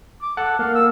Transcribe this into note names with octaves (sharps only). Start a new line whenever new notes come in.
D6
A4 F#5
A#3 F5
E6